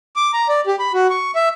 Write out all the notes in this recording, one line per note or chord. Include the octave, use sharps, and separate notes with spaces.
D6
A#5
D5
G4
B5
F#4
C#6
E5